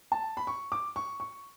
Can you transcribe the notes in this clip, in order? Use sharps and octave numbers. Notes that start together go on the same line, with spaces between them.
A5
B5
C#6
D6
C#6
C#6